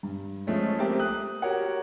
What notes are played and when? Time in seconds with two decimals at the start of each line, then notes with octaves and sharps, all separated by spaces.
0.03 G2
0.47 F3 G#3 A3 C#4
0.79 A3 A#3 C4 G4
0.99 D#6 F#6
1.42 F#4 G4 A#4 C#5 F#5